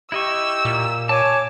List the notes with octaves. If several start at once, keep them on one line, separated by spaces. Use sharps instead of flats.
E4 G4 D#5 C#6 E6
A#2
C#5 G#5 A5 D6